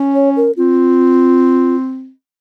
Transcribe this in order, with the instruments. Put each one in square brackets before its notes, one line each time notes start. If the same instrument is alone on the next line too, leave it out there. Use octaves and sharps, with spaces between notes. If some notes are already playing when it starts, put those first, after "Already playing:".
Already playing: [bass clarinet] C#4
[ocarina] C#5
A#4
[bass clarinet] C4 [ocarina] F4